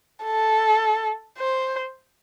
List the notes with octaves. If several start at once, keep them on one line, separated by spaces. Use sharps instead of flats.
A4
C5